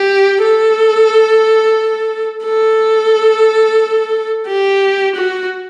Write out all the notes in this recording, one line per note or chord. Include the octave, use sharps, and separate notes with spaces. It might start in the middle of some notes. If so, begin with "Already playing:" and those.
Already playing: G4
A4
A4
G4
F#4